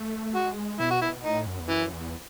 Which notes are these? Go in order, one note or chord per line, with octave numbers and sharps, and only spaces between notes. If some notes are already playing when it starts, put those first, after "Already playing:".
Already playing: A3
G#3 F#4
B2 E4
F#4
E4
A2 D#4
F#2
E2
F#2 E3
E2